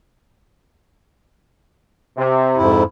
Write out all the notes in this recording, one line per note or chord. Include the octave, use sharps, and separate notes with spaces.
C3
F2 G#2 E4